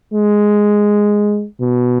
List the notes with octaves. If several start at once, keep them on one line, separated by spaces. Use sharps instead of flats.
G#3
B2